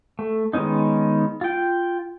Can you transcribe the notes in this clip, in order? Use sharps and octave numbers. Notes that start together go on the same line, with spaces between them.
A3
D#3 G#3 B3 C#4 D#4
F4 G5